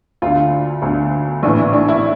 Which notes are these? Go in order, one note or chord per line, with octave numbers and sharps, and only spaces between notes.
D2 D3 F4
D2 D3
A#1 A2 E3 D4
E4
D4
E4